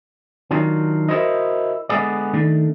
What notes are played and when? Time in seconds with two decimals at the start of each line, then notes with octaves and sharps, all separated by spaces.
0.51 D#3 F#3 D4 F4
1.09 E4 F#4 A#4 C5 D#5
1.89 D3 G#3 B3 G#4 D5
2.33 D#3 A3 D4